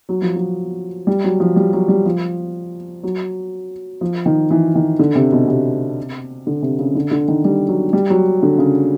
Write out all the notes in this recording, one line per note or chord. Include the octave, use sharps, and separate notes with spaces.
F#3
F3
F#3
G3
F#3
F3
G3
F#3
G3
F3
F#3
F3
D#3
E3
D#3
D3
C3
B2
C3
D3
C3
C#3
D3
D3
D#3
G3
F#3
G3
F#3
D3
C#3